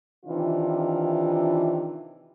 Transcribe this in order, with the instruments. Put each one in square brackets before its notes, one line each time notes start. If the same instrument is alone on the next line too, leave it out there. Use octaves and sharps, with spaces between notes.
[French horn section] C3 D#3 E3 D4 F4